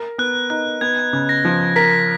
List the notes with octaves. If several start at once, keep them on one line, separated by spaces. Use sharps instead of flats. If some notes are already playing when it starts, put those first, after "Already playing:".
Already playing: A#4
B3 F#6
D#4 F#6
B3 G#6
C#3
A#6
F3
A#4 B6